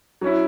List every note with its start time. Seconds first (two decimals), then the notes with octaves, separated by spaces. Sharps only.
0.21 F#3 C#4 E4